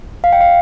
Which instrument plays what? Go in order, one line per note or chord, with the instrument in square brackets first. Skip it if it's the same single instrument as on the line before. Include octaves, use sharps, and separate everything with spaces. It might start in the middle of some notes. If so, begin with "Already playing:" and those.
[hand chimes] F5
G5
F5